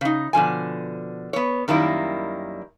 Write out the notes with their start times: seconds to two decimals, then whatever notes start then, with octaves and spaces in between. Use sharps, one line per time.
0.01 C#3 D#4
0.33 B2 D3 F3 G#5
1.33 B3 C#5
1.68 F#2 D#3 G3 A#3 E4